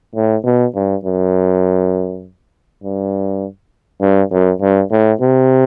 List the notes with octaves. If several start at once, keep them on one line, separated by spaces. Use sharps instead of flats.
A2
B2
G2
F#2
G2
G2
F#2
G2
A2
C3